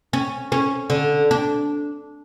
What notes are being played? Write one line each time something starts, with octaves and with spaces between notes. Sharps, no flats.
C#4
C#4
D3
D4